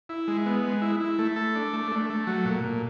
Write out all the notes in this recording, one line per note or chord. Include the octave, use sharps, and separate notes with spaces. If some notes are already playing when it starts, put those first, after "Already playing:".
E4
G#3
B3
G#3
E4
E4
A3
A4
D4
A3
A3
A3
F#3
A#2
A#2